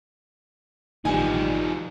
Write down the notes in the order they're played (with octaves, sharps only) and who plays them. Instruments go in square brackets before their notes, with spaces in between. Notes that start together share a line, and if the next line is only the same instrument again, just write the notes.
[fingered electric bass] A1 D#3 [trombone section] B2 G3 [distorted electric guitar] F3 D#4 [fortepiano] G#5